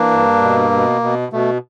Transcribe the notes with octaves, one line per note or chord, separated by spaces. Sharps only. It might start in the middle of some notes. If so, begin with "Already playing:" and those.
Already playing: E3 A#3 D4
G2
B2
B2
B2
B2 A3